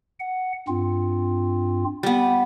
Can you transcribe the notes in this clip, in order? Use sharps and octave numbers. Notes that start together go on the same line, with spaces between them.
F#5
G2 C4 F4
G3 B3